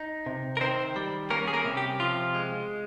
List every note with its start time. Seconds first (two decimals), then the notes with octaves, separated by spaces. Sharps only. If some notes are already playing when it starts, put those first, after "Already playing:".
Already playing: D#4
0.26 C3
0.57 A#4
0.61 D#3 C4 C5
0.96 G3
1.30 A#3 C#4 A#4
1.48 G#4
1.53 A#3 A#4
1.65 C3
1.77 G4
2.00 F3 F4
2.34 G#3